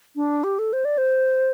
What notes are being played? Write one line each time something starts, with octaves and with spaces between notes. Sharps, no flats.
D4
G4
A4
C5
D5
C5